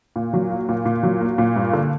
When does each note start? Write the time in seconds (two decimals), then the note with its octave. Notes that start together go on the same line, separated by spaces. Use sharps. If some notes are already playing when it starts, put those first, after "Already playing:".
0.16 A#2
0.33 F#3
0.51 A#3
0.69 A#2
0.85 A#2
1.03 F#3
1.21 A#3
1.38 A#2
1.56 G2
1.73 D3